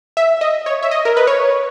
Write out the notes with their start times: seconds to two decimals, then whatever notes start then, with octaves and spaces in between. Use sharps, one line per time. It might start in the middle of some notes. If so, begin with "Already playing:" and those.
0.17 E5
0.41 D#5
0.66 C#5
0.83 E5
0.91 D#5
1.05 A#4
1.17 B4
1.27 C#5